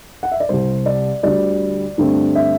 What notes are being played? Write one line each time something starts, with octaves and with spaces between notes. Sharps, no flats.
F#5
E5
D5
C2 C3 G3 C5
D5
D2 D3 G3 D5
G2 D3 A3 C4
E5